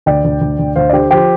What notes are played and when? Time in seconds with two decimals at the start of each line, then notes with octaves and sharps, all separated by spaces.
0.06 D2 D5 G5
0.24 D2
0.41 D2
0.59 D2
0.76 D2 C5 F5
0.89 D5
0.93 D3 G4 C5
1.10 F3 G4 C5